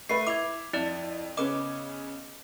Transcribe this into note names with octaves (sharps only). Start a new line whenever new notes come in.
A3 B4 C7
E4 D6 G#6 F7
F2 E4 D5 E5
C#3 B3 C#4 D#5 D6